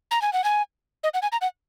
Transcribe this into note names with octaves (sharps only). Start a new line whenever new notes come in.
A#5
G#5
F#5
G#5
D#5
F#5
G#5
A#5
F#5